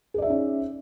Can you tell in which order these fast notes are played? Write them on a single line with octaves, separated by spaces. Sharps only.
G#4 D5 E5 D#4 C#4